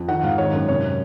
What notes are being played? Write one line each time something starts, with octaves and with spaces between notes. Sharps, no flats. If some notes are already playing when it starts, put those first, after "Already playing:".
Already playing: F2
D#3 F#5
G#2 F5
D#3 C#5
F#2
C3 C#5